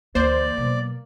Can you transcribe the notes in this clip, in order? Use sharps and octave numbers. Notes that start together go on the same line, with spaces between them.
D2 E3 A#3 C5 D5
B2 F#3